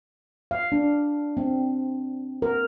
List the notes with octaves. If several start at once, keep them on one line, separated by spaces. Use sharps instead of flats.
F5
D4
C4
A#4